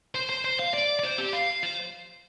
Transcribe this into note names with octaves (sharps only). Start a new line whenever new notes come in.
C5
C5
C5
F5
D5
D5
C5
G4
F5
C5